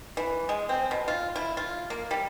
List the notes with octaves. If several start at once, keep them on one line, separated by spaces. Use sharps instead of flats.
E3
G#3
C4
B2
F4
E4
F4
A#3
G3